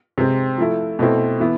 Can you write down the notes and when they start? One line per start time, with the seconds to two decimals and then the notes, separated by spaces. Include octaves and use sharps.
0.18 C3 G#3 C4
0.58 F3 A3 E4
0.99 B2 A3 C4 E4
1.40 E3 B3 E4